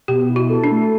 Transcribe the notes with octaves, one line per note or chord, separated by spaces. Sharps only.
B2 G4
E4
F#4
A4
D4
A3